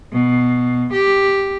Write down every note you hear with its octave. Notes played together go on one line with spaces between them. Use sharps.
B2
G4